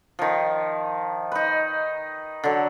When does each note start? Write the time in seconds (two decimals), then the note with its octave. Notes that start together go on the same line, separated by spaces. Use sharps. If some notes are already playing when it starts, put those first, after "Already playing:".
0.19 D#3 F3
1.32 D#4 B4
2.44 D3 F#3